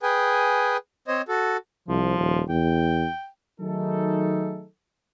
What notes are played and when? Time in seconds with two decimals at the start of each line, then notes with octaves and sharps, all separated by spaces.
0.03 G#4 B4 G5 G#5
1.08 C4 C5 C#5 D#5
1.28 F#4 A4
1.88 C2 F3
2.18 D#1
2.49 E2 G5
3.60 D#3 F#3 A3 D#4 G#4 A4